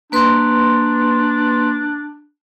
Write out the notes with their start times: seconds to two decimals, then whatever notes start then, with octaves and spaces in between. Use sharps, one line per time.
0.12 A#3 D4 B4 C6